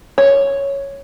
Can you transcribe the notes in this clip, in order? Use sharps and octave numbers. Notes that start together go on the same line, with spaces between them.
C#5